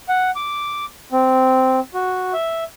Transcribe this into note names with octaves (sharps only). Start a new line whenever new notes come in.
F#5
D6
C4
F#4
E5